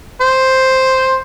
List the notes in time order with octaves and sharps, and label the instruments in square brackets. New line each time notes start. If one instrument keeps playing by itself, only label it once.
[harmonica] C5